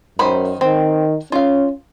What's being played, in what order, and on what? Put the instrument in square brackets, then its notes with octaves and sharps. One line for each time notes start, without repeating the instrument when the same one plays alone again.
[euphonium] F#2 [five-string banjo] D#3 C5 B5
[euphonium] D#3 [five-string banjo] C4
[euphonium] C#4 [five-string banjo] F4 F5